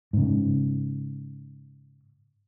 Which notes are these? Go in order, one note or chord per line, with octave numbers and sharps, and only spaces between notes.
G#2 C#3